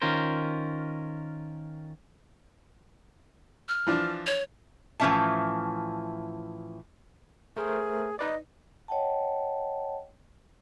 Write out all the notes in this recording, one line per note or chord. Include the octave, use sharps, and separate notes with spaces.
D#3 C#4 F4 A#4 C5
F6
E3 F3 D4
C#5
A2 E3 F3 C#4 E5 A5
A3 G#4 A#4 C5
D#4 B4 D5 D#5
C#5 D#5 F#5 G5 A5